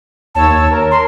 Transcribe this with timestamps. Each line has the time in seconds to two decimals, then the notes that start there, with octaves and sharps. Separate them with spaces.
0.35 D#2 C#5 A5 E6
0.70 A#4
0.91 C6